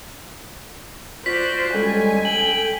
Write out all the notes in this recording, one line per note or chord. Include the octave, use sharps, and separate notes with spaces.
F4 F#4 C5 D5 B6
G3 G#3 C#4 A4 G#5
G5 F#7